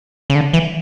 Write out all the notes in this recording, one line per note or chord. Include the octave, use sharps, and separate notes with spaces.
C#3
D3
E3